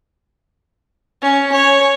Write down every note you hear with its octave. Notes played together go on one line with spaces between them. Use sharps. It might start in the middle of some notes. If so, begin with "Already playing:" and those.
C#4
C#5